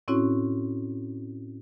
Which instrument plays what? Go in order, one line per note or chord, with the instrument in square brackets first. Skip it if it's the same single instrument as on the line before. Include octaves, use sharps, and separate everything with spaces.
[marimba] A2 C4 C#4 E4 F#4 C#5